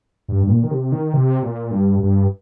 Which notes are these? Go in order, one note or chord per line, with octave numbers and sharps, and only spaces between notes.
G2
G2
A#2
D#3
C3
D#3
C3
A#2
G2
G2